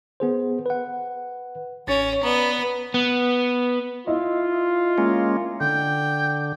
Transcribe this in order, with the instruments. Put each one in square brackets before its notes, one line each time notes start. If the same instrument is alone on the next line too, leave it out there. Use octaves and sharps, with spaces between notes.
[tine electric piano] B3 G#4 C5
B4 F#5
[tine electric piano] A1 A6 [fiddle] C#4
[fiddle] B3 [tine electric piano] D5 A#5
[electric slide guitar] B3
[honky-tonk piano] E4 D#5 [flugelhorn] F4
[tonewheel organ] G#3 A#3 C#4
[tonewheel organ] D3 [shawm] G5